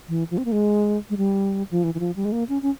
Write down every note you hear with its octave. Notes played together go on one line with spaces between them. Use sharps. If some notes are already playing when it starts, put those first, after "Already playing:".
E3
F3
C4
A#3
G#3
G#3
G3
F3
E3
E3
F3
G3
G#3
A#3
C#4
C#4